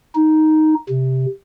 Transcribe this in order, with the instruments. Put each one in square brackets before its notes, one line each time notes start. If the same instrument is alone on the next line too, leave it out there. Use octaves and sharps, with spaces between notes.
[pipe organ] D#4
C3